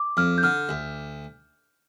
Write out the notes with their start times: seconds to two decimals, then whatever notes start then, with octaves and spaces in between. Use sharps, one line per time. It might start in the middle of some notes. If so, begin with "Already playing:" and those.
Already playing: D6
0.17 F2 F6
0.38 G6
0.43 D3 F6
0.69 D2